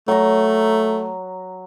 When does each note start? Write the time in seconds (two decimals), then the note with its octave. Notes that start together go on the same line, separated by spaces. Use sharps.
0.08 F#3 A3 A#5